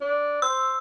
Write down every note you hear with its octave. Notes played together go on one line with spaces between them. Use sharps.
D4
C5 E6